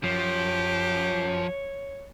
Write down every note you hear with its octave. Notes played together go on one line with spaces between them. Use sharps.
F#2 F3 G4 C#5